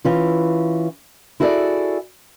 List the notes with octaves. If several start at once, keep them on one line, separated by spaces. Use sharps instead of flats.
E3 C#4 F4
E4 F#4 G#4 A4 C5 D5